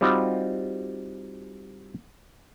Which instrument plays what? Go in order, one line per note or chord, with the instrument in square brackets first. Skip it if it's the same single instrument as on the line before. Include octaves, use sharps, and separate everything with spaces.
[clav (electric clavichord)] G3 C4 D#4 F4 F#4